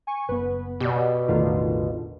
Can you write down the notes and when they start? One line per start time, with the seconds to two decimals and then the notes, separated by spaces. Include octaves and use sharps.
0.07 G#5 C#6
0.29 F#1 B3 B4
0.80 B2 G4 D5
1.28 A1 E2 D3 D#3 A3 F4